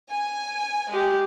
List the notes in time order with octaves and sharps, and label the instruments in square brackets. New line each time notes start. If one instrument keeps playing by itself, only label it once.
[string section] G#5
[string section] G#3 [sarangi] G4